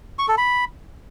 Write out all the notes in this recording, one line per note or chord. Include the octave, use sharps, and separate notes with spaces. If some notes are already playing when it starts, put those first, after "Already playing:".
C#6
A4
B5